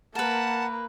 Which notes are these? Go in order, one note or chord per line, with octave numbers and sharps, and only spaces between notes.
A#3 A#4 B4 F#5 A5